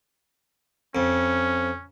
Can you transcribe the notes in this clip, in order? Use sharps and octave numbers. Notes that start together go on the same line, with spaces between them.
F2 C#4